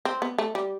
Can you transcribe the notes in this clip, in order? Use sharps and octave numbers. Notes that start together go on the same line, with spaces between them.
C4
B3
A3
G3